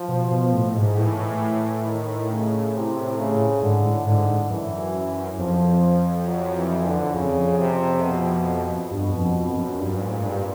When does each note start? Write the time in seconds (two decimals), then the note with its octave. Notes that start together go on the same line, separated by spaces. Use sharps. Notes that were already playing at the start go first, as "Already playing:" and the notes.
Already playing: F3
0.09 B2
0.31 B2
0.53 A2
0.76 G#2
0.97 A2 E3
1.86 D#3
2.30 C#3
2.74 C3
3.18 C#3
3.62 G#2 D3
3.84 A2
4.05 G#2 D3
4.50 F#2 E3
5.38 F2 F3
6.26 F#3
6.56 E3
6.85 D3
7.14 F2 C#3
7.58 C3
8.03 B2
8.90 G2 B2
9.13 F2
9.34 F2
9.57 F#2
9.79 G2 A#2
10.01 G#2
10.08 A2
10.15 G#2
10.24 G2